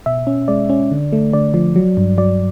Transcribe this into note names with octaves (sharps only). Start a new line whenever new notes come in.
B2 E5
C#4
G#3 D5
C#4
D3
A3
D3 D5
F3
F#3
G2
F#3 D5